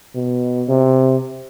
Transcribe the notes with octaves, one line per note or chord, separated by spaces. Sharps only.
B2
C3